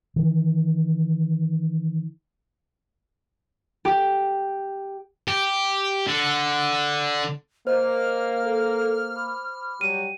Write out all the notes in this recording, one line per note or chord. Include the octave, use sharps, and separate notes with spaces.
D#3 E3
G4
G4
D3
A#3 C5 D#5 F5 F6
A4 F5
B5 D6
F#3 G3 G4 D#7